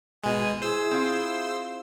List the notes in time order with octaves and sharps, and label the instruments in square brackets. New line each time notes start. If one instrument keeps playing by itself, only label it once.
[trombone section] G#1 [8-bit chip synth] B2 G#3 [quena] G#5
[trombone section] E4 [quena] G#4 [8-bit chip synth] C5 E6
[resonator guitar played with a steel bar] C4 F4